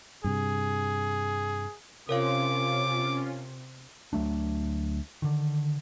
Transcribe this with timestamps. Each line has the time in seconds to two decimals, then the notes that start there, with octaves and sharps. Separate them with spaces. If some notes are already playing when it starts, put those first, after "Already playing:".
0.24 G2 C3 G#4
2.09 C3 C#4 F4 A#4 C#5 F5 D6
4.13 D2 F#3 A3 D4
5.22 D3 D#3